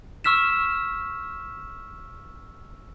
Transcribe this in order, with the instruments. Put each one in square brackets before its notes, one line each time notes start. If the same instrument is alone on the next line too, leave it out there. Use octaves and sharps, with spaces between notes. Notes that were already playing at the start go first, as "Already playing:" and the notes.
[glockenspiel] C#6 E6 F6 B6 E7